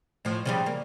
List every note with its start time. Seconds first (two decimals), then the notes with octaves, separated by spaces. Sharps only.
0.25 A2 F3
0.45 C#3 F3 G3
0.66 A#3